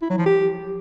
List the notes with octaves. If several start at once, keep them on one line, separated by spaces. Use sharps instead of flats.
E4
F#3
F3
G4